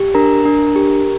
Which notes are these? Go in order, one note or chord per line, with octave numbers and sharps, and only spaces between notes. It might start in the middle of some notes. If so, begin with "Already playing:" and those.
Already playing: G4
D4 A#4 A#5
D4
G4